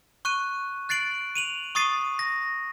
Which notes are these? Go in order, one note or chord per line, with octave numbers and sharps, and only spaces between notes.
C#6 F#6 D#7
F#6 A6 C7 D7 F#7
D#7 F7 F#7
C#6 D#6 A6 C7 D#7
A#6